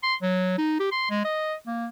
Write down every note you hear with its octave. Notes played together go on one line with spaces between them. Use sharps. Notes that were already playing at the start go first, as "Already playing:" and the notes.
C6
F#3
D#4
G4
C6
G#3
D#5
A#3